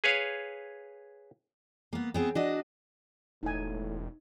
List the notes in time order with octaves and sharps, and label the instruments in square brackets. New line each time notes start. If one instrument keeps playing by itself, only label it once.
[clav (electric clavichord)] G#4 B4 C#5 F5
[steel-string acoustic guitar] A#3 B3
B3 C4 G#4
D4 F#4 D#5
[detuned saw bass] E1 [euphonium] A2 [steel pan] D#4 G#5